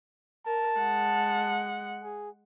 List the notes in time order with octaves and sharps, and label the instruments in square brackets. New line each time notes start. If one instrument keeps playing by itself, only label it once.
[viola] A#4 [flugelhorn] A5
[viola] G#3 F#5
[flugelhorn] G#4